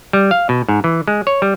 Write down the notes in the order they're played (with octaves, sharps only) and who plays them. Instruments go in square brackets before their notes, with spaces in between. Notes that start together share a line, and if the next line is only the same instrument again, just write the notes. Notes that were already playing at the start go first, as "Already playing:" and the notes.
[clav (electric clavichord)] G3
F5
B2
G#2
E3
G#3
C#5
G3